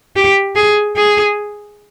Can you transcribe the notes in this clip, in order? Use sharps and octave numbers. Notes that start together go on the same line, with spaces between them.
G4
G#4
G#4